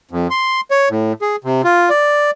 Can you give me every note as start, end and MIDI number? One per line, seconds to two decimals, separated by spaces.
0.11 0.28 41
0.30 0.61 84
0.71 0.89 73
0.90 1.13 45
1.22 1.36 68
1.44 1.62 48
1.64 1.89 65
1.90 2.31 74